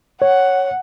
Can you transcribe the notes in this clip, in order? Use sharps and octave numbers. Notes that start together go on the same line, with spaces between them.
C#5 F#5